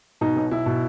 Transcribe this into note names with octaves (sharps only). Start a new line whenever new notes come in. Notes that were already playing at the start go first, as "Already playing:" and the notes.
B2 D#4
B1
B1 E4
B2